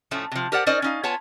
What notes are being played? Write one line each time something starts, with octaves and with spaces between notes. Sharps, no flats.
A2 F3 A3 C#4
C3 F3
G4 A#4 C5 D5 F#5
C#4 D#4 A#4 C5 D5 D#5
C#4 D#4 F5
B3 F4 C#5 G#5 A5